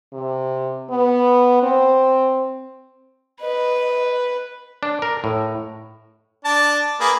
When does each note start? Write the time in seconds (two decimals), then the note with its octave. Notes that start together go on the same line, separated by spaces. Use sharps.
0.13 C3
0.90 B3
1.63 C4
3.41 B4 D#5
4.83 D4
5.02 A#4
5.24 A2
6.45 D4 A5
7.00 A#3 G#4 B4